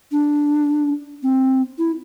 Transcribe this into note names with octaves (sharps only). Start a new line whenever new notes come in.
D4
C4
E4